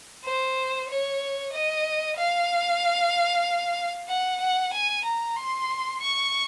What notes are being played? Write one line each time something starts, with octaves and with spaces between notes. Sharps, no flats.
C5
C#5
D#5
F5
F#5
F#5
G#5
A#5
C6
C#6